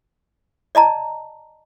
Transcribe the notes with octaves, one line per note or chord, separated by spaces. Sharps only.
D5 D#5 A5 A#5